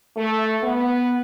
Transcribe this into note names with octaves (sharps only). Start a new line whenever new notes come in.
A3
B3